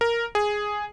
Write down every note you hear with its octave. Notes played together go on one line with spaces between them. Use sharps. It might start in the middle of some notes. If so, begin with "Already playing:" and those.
A#4
G#4